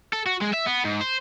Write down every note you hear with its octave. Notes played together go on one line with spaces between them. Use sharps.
A4
F#4
G#3
E5
B3
G#2
C5